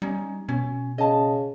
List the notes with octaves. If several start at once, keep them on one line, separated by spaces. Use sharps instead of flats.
G3 C#4 D#4
B2 C#4
C#3 D#5 A5